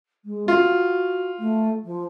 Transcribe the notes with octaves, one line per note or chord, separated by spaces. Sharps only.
G#3
F4 F#4
A3
F3